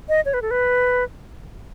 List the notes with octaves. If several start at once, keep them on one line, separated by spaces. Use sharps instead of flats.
D#5
C#5
B4
A4
B4